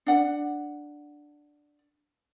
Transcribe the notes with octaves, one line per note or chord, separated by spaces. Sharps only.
D4 F#5